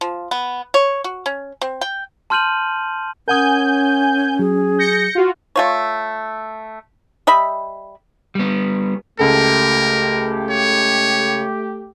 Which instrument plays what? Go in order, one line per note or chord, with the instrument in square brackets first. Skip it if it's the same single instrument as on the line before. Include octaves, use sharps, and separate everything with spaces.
[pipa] F3
B3
C#5
F#4
C#4
C4
G5
[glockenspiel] A5 C6 F6 G6 D#7 F#7
[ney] C#4 [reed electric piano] A#4 F#5 D#6 [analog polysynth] G#5 G6
[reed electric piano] F#3 [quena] G#4
[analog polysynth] G6 A#6 C#7
F4 F#4
[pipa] A3 F4 C#5
G3 D#5 E5 B5
[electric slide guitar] G3 B3
[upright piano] C#2 A4 [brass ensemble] A3 G4 [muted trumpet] A#4
[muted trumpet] C#5